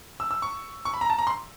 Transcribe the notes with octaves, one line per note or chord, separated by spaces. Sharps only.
E6
E6
C#6
C#6
B5
A#5
A5
A#5
C6